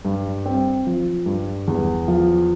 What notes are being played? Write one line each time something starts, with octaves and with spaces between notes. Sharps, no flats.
G2
C4
F3
G2
E2
F3